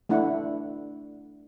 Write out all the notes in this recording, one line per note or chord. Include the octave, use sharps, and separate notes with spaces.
A3 D4 E4 F#5